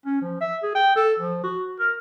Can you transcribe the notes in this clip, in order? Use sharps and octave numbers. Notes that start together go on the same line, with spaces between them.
C#4
F3
E5
G#4
G5
A4
F3
F#4
A#4